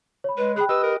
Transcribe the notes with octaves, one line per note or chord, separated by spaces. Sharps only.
C#5 B5
G#3 B4
G#4 G5 B5 F#6
G4 B4 D#5 E6
A#4